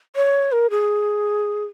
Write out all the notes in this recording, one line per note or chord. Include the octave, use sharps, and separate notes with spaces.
C#5
A#4
G#4